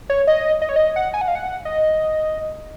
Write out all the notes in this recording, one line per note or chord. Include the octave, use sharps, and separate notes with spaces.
C#5
D#5
D#5
C#5
D#5
F#5
G#5
F#5
F5
F#5
D#5